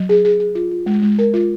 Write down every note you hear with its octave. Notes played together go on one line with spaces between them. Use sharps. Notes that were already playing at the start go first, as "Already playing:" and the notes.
Already playing: F#3
G#4
G#4
G#4
F4
F4
G#3
G#3
A#4
F4